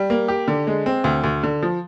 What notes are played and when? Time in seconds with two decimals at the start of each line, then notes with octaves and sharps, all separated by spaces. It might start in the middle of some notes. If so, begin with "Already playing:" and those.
Already playing: G3
0.10 A#3
0.28 G4
0.48 D3
0.67 G#3
0.86 C4
1.04 D2
1.24 D2
1.43 D3
1.62 F3